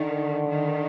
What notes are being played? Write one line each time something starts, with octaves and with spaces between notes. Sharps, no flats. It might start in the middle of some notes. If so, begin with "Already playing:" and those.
Already playing: D3 D#3
D#3